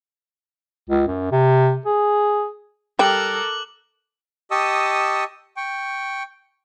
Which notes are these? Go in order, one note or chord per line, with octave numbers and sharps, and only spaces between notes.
C#2
F#2
C3
G#4
G3 A4 A#4 G5 D6 F#6 F#7
G4 D#5 A5 C#6 D#6 E6
G5 C#6